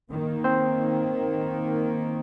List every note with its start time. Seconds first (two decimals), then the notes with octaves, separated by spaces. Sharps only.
0.12 D#3 A#3
0.44 C4 C5